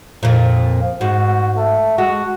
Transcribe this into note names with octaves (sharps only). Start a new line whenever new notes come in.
F2 A#2
G#2 F#4
A3
G#3 F#4